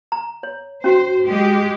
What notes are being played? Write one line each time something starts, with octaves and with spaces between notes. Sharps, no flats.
A#5
C#5
C#4 F#4 C5
G#3 G4